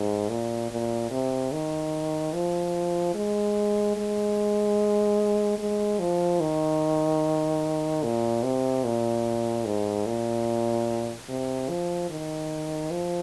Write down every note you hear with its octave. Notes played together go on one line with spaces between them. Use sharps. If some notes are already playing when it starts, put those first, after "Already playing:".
Already playing: G#2
A#2
A#2
C3
D#3
F3
G#3
G#3
G#3
F3
D#3
A#2
C3
A#2
G#2
A#2
C3
F3
D#3
F3